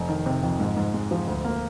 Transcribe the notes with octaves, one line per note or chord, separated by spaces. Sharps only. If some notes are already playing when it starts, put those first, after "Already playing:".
Already playing: F1
D#3
C3
F2
G#2
G#2
G#3
F3
D2
A#3